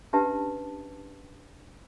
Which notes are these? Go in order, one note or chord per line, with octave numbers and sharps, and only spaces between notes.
C#4 D4 G4 B4 E5 A5